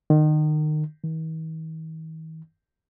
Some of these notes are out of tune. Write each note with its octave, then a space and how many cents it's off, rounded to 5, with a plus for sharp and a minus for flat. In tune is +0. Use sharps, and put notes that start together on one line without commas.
D#3 -30
D#3 +45